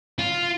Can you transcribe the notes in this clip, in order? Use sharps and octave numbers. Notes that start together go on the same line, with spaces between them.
F4